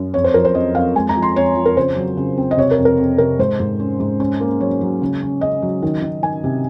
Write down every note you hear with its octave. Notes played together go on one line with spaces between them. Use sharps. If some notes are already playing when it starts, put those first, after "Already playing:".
Already playing: F#2
F2 C#5
C5
F3 A#4
C5
F2 D#5
F2 F5
G#3 G#5
A#5
F3
C6
F2 C#5
F3
A#4
C#3 C5
F#3
C#3
C4
D#5
C3 C#5
A#4
F2
A#4
F2
C3 A#4
G#2 C5
G#2
C#4
G#2
C#4
A#3
F#3 C#5
F#3
C#3
C#4
C#3 D#5
F#3
D#3
D#3
D#3 G#5
C3